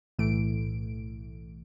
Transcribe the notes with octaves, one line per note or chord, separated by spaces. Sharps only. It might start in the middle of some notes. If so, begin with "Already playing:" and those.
B1 A2 E3 A3 D7